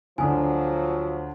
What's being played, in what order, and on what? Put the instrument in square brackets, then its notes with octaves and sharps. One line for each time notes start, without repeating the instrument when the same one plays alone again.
[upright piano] D2 D4 [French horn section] F3 F#3 [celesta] G#5 D#6